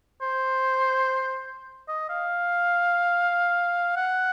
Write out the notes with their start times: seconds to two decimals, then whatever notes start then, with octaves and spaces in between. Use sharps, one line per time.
0.22 C5
1.88 D#5
2.09 F5
3.96 F#5